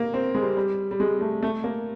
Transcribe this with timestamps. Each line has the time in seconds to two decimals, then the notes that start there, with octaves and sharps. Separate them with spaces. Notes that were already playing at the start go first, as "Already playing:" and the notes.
Already playing: A#3
0.14 C4
0.35 G#3
0.42 G3
0.57 G3
0.91 G3
1.00 G#3
1.21 A3
1.43 A3
1.64 A#3